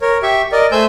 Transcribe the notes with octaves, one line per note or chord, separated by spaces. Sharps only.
A#4 C#5
G4 E5 C#6
A#4 D5 D#5
A3 C5 G#5 E6 G6